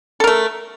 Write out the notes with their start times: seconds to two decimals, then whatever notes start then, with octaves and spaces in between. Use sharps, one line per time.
0.20 A4
0.24 A#4
0.27 A3